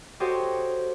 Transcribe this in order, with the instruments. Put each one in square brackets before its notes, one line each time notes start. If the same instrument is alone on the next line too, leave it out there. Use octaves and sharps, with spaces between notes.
[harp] F#4 G4 A4 C5 C#5 D#5